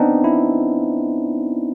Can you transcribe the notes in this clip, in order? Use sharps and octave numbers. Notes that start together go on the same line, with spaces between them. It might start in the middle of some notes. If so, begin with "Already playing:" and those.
Already playing: B3 C4 D4 D#4
E4